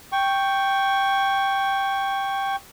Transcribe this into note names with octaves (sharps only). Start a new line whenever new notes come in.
G5 C#6